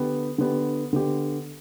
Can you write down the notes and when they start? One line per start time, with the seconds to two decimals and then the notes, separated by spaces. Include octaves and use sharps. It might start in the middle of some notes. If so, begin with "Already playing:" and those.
Already playing: D3 B3 G4
0.38 D3 B3 G4
0.93 D3 B3 G4